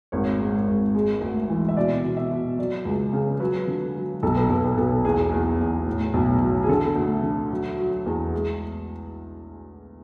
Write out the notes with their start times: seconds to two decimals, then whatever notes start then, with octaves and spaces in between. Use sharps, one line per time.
0.12 G#1 C#5
0.40 G#2
0.67 G#1
0.95 G#3
1.21 D2
1.50 E3
1.69 E5
1.77 B2 D5
2.04 B2
2.17 E5
2.31 B2
2.58 F#3 D5
2.85 C#2
3.13 C#3
3.40 F#3 B4
3.67 D3
3.95 F#3
4.23 B1 A4
4.36 B4
4.49 B1 A4
4.64 B4
4.77 B1 A4
5.05 E2 G#4
5.32 E2
5.60 E2
5.87 A2
6.14 B1
6.42 F#3
6.63 G#4
6.69 D3 A4
6.96 D2
7.23 D3
7.50 F#3
7.78 F#3
8.06 E2
8.33 G#3